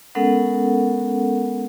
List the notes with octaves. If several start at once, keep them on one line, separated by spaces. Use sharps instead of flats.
G#3 B3 C#4 A4 A#4 F#5